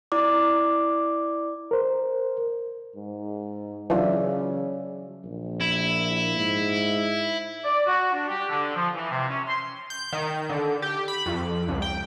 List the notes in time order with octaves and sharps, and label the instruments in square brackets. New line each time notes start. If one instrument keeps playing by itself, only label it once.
[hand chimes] E4 D5 D6
[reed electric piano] A#4 C5
[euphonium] G#2
[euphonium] C#3 [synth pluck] E3 D4 F4 [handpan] F#3 D5 E5
[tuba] A#1
[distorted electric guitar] E4
[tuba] G#2
[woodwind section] D5
F#4
D4
G4
D3
F3
E3
C3
C#4
C6
[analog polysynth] G6
D#3
D3
G4
B5
F2
C#2
G5